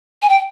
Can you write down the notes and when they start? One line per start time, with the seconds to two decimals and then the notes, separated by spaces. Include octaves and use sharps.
0.22 G#5
0.29 G5